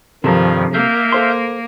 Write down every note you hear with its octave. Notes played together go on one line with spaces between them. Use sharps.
G2 C3 D#3 F3 A4 A#4
A#3 E5 F5 G6
A4 C5 C6